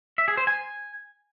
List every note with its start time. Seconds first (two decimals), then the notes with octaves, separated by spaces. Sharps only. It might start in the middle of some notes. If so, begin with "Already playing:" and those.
0.18 E5
0.28 G#4
0.37 C5
0.47 G#5